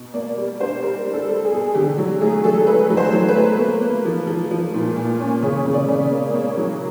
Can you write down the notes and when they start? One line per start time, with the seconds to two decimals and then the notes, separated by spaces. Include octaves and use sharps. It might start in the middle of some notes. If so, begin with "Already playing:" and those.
Already playing: B2
0.14 A#3 D5
0.37 G3
0.60 D4 C5
0.83 G3 A#4
1.06 D4
1.13 A4
1.29 G3
1.45 G#4
1.52 B2
1.75 D3 G4
1.98 F#3
2.21 A3 G#4
2.44 F#3 A4
2.66 A3 B4
2.90 F#3
2.97 C5
3.12 F#3
3.29 B4
3.36 A3
3.58 A#3
3.82 A#3
4.05 F3
4.27 F3
4.51 F3
4.74 A#2
4.96 A#2
5.19 C#4
5.43 C#3 C#5
5.66 C#3
5.73 D5
5.89 C#3
6.03 D5
6.11 A#3
6.34 A#3 C#5
6.58 F#3